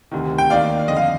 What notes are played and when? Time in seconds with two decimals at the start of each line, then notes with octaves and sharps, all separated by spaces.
0.11 D2 C3 D#3
0.38 G5
0.50 D#2 D#3 D5 F5
0.88 F2 D3 D#5
0.97 F5